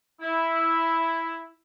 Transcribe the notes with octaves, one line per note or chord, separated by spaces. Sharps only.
E4